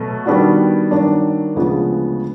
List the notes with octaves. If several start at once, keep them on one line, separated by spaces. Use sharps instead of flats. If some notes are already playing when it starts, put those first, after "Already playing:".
Already playing: B2 F#3 A3
D#3 G3 B3 D4 F#4
G2 D#3 F#3 A#3 D4
D2 C#3 F3 G#3 B3